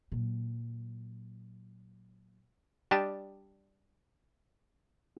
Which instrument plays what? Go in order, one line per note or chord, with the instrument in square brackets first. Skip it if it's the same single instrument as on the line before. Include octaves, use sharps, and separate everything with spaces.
[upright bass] A#2 F#3
[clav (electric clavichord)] G3 D4 G4 D#5 A5